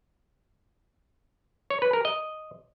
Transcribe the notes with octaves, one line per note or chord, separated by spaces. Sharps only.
C#5
B4
A#4
D#5